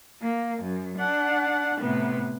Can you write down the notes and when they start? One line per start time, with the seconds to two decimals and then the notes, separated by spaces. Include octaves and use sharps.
0.22 A#3
0.62 F#2
0.97 D4 F#5
1.81 A2 C3 B3